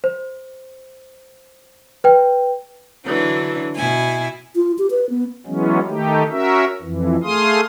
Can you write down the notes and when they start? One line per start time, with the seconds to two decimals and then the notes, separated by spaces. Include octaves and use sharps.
0.04 C5
2.04 B4 G5
3.06 D3 E3 F#3 D4
3.76 B2 E4 G#5
4.56 F4
4.78 G4
4.91 B4
5.10 B3
5.46 E3 F#3 G#3 B3 C#4
5.87 D#3 A3 D#4 G4
6.30 C#4 F#4 A#4 E5
6.82 F2 E3
7.23 A3 G#4 F5 C6 D#6